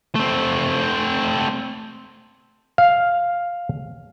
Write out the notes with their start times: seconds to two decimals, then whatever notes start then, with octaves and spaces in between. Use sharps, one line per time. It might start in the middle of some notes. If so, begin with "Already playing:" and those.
0.15 A3 C4
2.78 F5